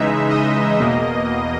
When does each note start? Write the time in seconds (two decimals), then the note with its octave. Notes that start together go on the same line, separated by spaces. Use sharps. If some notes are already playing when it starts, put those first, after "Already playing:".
Already playing: C#3 E3 G#3 D#4 E5
0.29 D#5
0.80 E2 B2 A#3